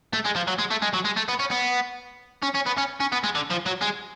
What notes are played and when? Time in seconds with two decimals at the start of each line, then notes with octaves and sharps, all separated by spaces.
0.13 A3
0.25 G#3
0.36 F3
0.48 F#3
0.59 G#3
0.71 A3
0.82 G#3
0.94 F#3
1.05 G#3
1.17 A3
1.29 B3
1.39 C#4
1.51 B3
2.43 C#4
2.55 C#4
2.66 B3
2.78 C#4
3.00 C#4
3.12 B3
3.24 G#3
3.35 D3
3.50 F3
3.66 F#3
3.81 G#3